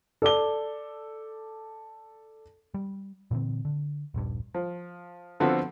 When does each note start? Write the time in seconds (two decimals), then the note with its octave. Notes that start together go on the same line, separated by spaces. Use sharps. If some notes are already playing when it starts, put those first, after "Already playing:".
0.22 A4 D5 D6 G7
2.74 G3
3.31 A#2 D3 E3 C4
3.65 D3
4.14 D#1 A#1 G2
4.54 F3
5.40 D3 F3 B3 C4 F#4 A4